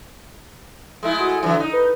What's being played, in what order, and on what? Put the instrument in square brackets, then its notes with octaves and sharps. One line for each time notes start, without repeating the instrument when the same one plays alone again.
[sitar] G#3 A3 E4
[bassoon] F#4
[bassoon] D3 [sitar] E3 F#3
[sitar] D#4
[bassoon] B4